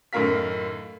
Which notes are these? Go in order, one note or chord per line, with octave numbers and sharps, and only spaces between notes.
F#2 A2 D#3 A#4 F5 B6